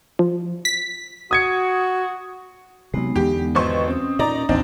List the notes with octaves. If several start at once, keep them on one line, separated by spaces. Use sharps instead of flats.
F3
B6
F#4 D#6 G#6 C#7
C3 F#3 G#3 B3 D#4
E2 D3 G4
G#1 B4 C5 D#5 G5 C#6
C4 C#4 D#6
A#2 D#4 D5 A#5
A1 D#2 C4 D4 D#4 F4